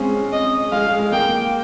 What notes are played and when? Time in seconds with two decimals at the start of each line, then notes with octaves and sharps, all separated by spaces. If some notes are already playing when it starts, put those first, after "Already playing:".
Already playing: G#3 C4 C#4 F4
0.33 D#5
0.72 G#3 F5
0.86 G#3
0.99 G#3
1.12 A#3 G5